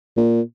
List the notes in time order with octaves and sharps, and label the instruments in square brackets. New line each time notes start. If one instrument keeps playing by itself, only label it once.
[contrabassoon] A#2